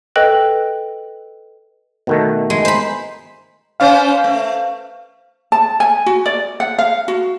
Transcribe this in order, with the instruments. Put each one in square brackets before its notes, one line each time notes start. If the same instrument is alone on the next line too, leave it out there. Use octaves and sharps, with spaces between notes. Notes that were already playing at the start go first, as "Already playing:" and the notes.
[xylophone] A4 B4 D#5 G5 F#6 F#7
[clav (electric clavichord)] B2 D#3 A3
[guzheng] G#3
C5 B5
[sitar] B3 C#4 C5 [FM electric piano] F5
[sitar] A3
[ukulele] A5
G#5
F#4
D5
F#5
F5
F#4